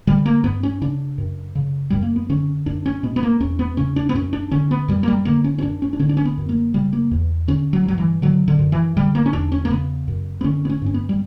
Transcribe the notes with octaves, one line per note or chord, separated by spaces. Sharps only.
D3 G3
A#3
G2 B3
C#4
C#3 D4
F#2
C#3
F#2 G3
A#3
B3
D3 C#4
F#2 D4
C#4
B2 B3
B3
A#3
E2 C#4
B3
C#3 C#4
D4
B3
F#2 C#4
D4
D3 C#4
B3
F#2 G3
A#3
G3
D3 A#3
C#4
C#4
F#2 D4
C#4
D4
D3 C#4
D4
C#4
B3
F#2
A#3
C#3 G3
A#3
E2
D3 C#4
F#3
G2 F#3
E3
D3 F#3
D3
F#2
E3
D3 G3
A#3
C#4
E2 D4
C#4
A#3
C#3 B3
F#2
B3
D3 C#4
B3
C#4
G2 C#4
B3
G3